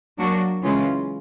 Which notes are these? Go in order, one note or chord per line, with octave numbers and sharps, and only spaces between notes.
F#3 A#3 D4 F#4
C#3 E3 G#3 C#4 F4